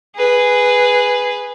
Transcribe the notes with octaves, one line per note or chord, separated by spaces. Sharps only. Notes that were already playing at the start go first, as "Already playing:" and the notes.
G#4 B4